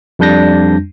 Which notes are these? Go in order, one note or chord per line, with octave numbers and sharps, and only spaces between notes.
F2 G3 D4 G6 A#6